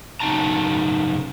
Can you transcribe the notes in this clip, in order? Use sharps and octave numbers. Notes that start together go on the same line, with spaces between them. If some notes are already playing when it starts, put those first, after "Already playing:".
F#2 C#3 D#4 G5 A5 A#5